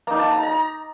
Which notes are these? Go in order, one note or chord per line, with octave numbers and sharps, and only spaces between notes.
A#3 D#4 A#5
A5
A#5
A#5